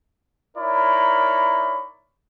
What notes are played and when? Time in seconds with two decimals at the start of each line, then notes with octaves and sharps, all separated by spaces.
0.57 D#4 E4 A#4 C#5 D5 B5